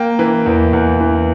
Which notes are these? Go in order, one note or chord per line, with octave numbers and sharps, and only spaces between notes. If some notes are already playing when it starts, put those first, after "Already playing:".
Already playing: A#3 G5
E3
E2
E2
E3